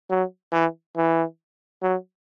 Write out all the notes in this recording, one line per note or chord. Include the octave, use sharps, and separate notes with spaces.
F#3
E3
E3
F#3